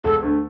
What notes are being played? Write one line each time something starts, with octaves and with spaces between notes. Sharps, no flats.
E1 A4
D2 D3 A3